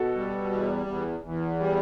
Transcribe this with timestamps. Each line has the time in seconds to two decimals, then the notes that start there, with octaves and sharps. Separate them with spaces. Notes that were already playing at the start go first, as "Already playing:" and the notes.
Already playing: B2 F#4 A4
0.15 G3
0.51 E2
0.87 E2
1.24 E2
1.60 G3